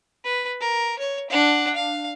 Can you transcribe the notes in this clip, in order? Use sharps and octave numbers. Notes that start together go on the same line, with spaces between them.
B4
A#4
C#5
D4 F#5
F5